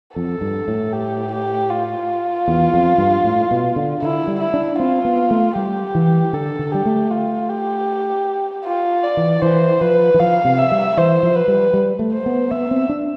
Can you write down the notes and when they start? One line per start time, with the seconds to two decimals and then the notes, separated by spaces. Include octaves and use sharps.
0.16 F2 A4
0.41 G2
0.68 A2
0.92 G4
1.32 G4
1.70 F4
2.48 E2
2.74 F2
2.98 G2
3.24 A2
3.51 B2
3.76 D3
4.02 D3 E4
4.27 G3
4.40 E4
4.54 D4
4.79 C4 F4
5.05 B3
5.31 A3
5.56 G3 G4
5.95 E3
6.33 D3 A4
6.59 D3
6.71 G3 G4
6.86 A3
7.11 F4
7.49 G4
8.65 F4
9.04 D5
9.17 E3
9.42 E3 C5
9.81 F3 B4
10.14 E3
10.20 F3 F5
10.45 C3
10.58 E5
10.72 G3
10.97 E3 C5
11.23 F3
11.35 B4
11.48 G3
11.74 G3
11.99 A3
12.13 C5
12.26 B3
12.51 B3 E5
12.71 C4
12.89 D4